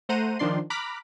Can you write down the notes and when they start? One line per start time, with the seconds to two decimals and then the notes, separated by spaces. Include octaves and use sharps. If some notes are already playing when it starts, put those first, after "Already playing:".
0.09 A3 C5 F#5 A#5 D#7
0.39 D#3 F3 D4 D5 C6
0.70 A#5 B5 D6 F6 F#6 B6